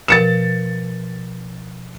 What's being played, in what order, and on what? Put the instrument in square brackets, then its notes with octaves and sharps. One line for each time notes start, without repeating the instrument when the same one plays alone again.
[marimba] B2 F3 A#4 [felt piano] A6 C#7 E7